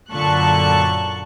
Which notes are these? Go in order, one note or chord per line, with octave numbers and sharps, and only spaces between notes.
F#2 A#2 D3 A5 C#6 F#6